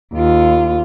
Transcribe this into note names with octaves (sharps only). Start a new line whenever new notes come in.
D#2 F4